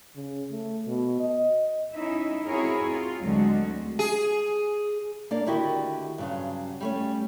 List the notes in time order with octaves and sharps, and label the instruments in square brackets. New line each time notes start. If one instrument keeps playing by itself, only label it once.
[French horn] C#3
A3
B2
D#5
[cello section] C#4 D#4 E4 E5
C4 E4 F#4 G#4 A#4 C#5
F4
D2 D3 F#3 G#3 C4 F#4
[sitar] G#4
[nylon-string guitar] A#3 D4 D5
D3 D#3 E4 F#4 G4
G2 C#3 F#3
G3 A3 C#4